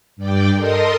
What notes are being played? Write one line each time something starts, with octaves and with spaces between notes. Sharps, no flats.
G2 D5 G5
A4 A#4 D#5 C6 D#6